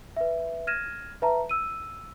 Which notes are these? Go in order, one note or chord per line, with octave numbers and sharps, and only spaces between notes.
B4 E5
F6 G#6 A#6 D#7 E7
B4 E5 A5 A#5
E6 D#7